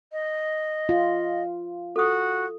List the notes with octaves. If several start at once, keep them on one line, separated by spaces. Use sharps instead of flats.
D#5
F4
F#4 A4 D#6